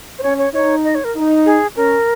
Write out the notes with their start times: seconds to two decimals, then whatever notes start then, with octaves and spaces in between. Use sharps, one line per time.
0.19 C5
0.23 C#4 C#5
0.38 C#5
0.53 D#4 C#5
0.85 D#5
0.95 C#5
1.04 A#4
1.15 D#4
1.46 G#4
1.76 C#4 A#4